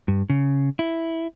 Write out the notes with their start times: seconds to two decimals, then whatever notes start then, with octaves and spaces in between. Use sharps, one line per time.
0.08 G2
0.30 C#3
0.79 E4